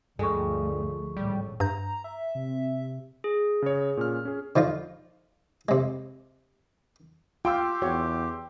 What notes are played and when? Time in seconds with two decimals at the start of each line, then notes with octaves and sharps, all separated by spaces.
0.19 D2 G2 F3 G#3 A3 A4 C#6
1.17 G#1 A2 G3
1.60 G2 A#5 G6
2.04 E5
2.35 C3
3.24 G#4
3.62 C#3 C#5
3.97 A#2 C#4 F6
4.25 C#4 G#4
4.56 D3 F3 D#4 F4
5.69 C3 G#3
7.45 F4 G4 G5 C6 E6
7.82 E2 F#4 C#5